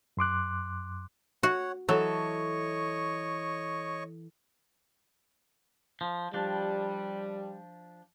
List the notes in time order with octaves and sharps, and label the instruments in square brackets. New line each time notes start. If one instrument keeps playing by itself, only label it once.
[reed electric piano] F#2 C6 D6 F#6
[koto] F#4 [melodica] C#5 F#5
[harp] E3 A4 [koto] F#3 [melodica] C#5 D#5 C#6
[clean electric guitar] F3
[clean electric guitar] F3 D4 [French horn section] G3